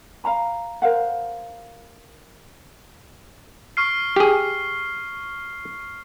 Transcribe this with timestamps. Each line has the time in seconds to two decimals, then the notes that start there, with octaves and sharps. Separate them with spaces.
0.24 F5 F#5 A#5 B5
0.82 A#4 C5 F5 F#5
3.77 C#6 F6 C7
4.16 G4 G#4